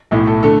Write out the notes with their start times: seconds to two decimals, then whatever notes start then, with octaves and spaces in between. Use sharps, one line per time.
0.11 B1 A2 A3 E4
0.27 A4
0.43 D3 A3 A4